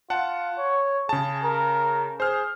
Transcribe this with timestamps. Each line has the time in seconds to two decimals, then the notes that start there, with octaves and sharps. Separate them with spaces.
0.10 F4 F#5 A5
0.58 C#5
1.09 C#3 G#4 A5
1.44 A#4
2.20 G#4 C5 F6